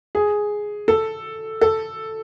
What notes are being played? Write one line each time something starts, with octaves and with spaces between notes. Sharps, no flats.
G#4
A4
A4